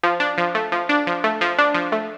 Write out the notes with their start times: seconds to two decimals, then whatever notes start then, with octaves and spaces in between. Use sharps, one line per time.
0.03 F3
0.20 D4
0.38 F3
0.55 A3
0.72 F3
0.89 D4
1.07 F3
1.24 A3
1.41 F3
1.58 D4
1.74 F3
1.92 A3